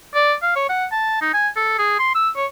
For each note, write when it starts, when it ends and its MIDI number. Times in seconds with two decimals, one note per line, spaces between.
0.15 0.34 74
0.42 0.54 77
0.56 0.68 73
0.69 0.86 78
0.92 1.20 81
1.22 1.33 63
1.34 1.48 80
1.56 1.78 69
1.79 1.98 68
1.99 2.14 84
2.15 2.29 88
2.36 2.46 73